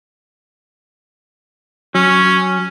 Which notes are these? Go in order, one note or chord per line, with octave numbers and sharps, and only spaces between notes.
F#3 C#4